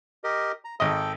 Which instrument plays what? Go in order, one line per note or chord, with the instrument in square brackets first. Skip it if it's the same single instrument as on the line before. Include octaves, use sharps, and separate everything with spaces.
[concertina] G4 A#4 D#5
A#5
[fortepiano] G#1 D#5 [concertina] A4 G5